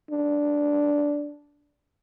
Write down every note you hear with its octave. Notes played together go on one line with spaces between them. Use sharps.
D4